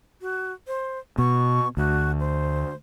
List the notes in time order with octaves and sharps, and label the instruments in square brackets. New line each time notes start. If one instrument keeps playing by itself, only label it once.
[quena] F#4
C5
[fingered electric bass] B2 [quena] C#6
[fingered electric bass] D2 [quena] F#4
[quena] C5